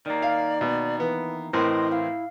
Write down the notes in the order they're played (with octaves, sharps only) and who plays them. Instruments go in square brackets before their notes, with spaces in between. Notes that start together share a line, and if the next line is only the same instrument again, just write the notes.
[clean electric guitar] D#3 A#3 [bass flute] D5
[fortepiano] F5
B2
[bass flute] E3 [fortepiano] B3
[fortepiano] A2 C4 A#4 [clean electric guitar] E3 [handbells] E4 C6 [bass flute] D#5
[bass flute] E4 [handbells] F5